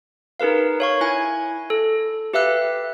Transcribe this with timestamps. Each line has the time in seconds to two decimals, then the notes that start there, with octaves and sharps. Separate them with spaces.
0.40 D#4 G#4 A#4 B4 F5
0.80 C#5 F5 C#6
1.01 E4 G#5 G#6
1.70 A4
2.34 G4 B4 E5 F5 E6 F#6